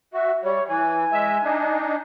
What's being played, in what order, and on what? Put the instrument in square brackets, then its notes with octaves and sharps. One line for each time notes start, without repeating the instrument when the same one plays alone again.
[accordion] F#4 [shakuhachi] E5
[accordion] G3 [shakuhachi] C#5
[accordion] E3 [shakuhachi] G#5
[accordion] G#3 E5
D4 D#4